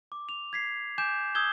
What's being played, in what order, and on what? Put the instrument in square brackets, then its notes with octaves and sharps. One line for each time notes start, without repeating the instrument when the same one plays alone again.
[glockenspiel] D6
F7
G#6 B6 C7
G#5 D6 G6 E7
D#6 E6 G6 G#6 G7